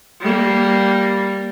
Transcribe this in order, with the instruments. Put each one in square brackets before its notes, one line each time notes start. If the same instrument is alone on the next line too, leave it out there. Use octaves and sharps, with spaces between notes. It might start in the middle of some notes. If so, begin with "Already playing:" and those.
[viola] G3 A#3